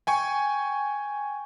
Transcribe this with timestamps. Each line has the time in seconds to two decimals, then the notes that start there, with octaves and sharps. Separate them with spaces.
0.07 G5 G#5 C#6